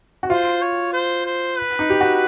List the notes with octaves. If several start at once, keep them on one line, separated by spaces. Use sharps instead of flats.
F#4
F4 C5
C#5
C5
C5
B4
D#4
G4
F#4